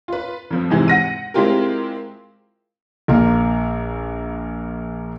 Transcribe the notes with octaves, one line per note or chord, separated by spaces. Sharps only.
F4 B4
F2 F3
G#2 C3 E3 G#3
F#5 A#6 D#7
G#3 C4 E4 F4 G4 A#4
A#1 A#3